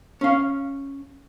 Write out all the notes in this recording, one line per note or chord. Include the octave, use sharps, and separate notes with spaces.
C#4 F5